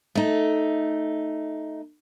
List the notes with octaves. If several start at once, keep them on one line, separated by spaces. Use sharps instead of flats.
A3 D#4